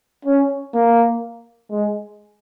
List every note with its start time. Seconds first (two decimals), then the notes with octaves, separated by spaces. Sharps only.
0.25 C#4
0.74 A#3
1.70 G#3